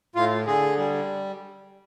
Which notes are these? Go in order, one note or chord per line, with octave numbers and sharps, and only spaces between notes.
A2 F4
D3 G#4
G3